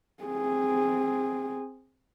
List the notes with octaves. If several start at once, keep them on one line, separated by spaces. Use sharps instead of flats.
C4 G#4